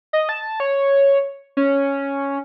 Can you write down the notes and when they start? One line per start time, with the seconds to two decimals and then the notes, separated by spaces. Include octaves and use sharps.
0.13 D#5
0.29 A5
0.60 C#5
1.57 C#4